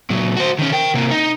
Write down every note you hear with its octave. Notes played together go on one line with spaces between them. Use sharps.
A#2 F#3
F#4 C5
D#3 C#4
A#4 G5
C3 A#3
D#4